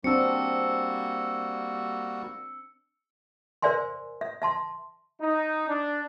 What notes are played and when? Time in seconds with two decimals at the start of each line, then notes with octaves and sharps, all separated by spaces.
0.04 G3 A#3 C4 D4 F#4 E6 C#7
3.62 A#4 C5 D5 E5 G#5 C6
4.21 E5
4.42 E5 A5 C6
5.21 D#4
5.68 D4